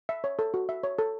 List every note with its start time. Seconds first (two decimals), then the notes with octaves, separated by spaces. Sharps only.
0.09 E5
0.24 C#5
0.39 A4
0.54 F#4
0.69 E5
0.83 C#5
0.99 A4